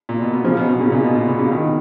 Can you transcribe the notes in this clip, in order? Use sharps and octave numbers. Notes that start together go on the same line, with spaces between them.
A#2
B2
B2
C#3 F3
B2
B2
A#2 C#3
A#2 C#3
B2
A#2
B2
A#2 C#3
B2 D#3